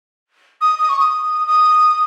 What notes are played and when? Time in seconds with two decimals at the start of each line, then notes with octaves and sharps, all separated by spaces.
0.61 D#6
0.79 D#6
0.89 C#6
0.99 D#6
1.47 D#6